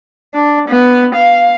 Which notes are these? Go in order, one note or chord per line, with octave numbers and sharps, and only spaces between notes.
D4
B3
F5